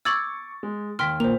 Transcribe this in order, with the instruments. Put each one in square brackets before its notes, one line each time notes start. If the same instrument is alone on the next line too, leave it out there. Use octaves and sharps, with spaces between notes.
[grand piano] C#6 D6 A6 [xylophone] E6 G#6 F#7
[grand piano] G#3
[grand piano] D#2 B6 [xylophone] G5 C6 F6
[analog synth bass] A#2 [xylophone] C5 F7